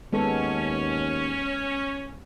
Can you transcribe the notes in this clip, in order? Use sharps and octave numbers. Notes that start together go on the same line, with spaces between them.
D#2 G#3 B3 C#4 A4